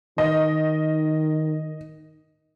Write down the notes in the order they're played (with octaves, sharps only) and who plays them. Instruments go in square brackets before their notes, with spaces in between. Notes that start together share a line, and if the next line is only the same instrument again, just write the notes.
[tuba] D#3 [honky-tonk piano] D#5